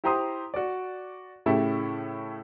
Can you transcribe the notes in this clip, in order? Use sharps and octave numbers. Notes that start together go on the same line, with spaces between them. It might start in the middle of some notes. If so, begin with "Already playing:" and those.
E4 G4 C5 A#5 C6 D#6
F#4 D5
A2 C#3 A3 E4 G4 A4